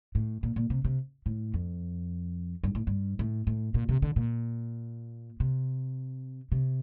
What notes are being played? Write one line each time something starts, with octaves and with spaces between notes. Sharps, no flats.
A2
A#2
A#2
C3
C3
A2
F2
G2
A2
G2
A2
A2
A#2
C3
D3
A#2
C3
C3